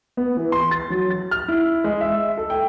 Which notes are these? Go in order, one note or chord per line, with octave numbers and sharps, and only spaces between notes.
B3
E3
C6
A6
F#3
A6
F6
E4
G#3
E5
A4
G5